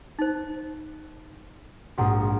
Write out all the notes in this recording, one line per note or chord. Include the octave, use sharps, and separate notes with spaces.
D#4 C5
A#1 G#2 F#4 F#5 A#5 D#6